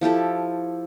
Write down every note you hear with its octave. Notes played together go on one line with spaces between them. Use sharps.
F3 E4 G4 A4